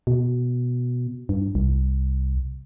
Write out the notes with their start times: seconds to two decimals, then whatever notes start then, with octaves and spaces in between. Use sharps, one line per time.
0.07 B2
1.29 G2
1.55 C2